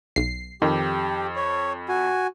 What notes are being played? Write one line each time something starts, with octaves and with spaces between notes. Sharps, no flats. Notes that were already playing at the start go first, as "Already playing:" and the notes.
B1 C7
F2 D#3 G4
C#5
F#4 G#5